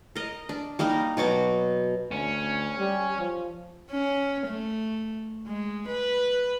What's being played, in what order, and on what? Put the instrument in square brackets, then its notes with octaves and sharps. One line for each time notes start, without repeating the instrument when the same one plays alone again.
[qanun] A#4 D#5
D4
G3 A#3 D#4 A#4
B2 F#3 F#4 D6
[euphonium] D2 [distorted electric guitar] C#4
[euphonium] G3
F3
[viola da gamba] C#4
A3
G#3
B4